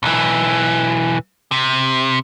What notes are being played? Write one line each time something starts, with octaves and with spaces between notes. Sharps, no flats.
B1 E3
C3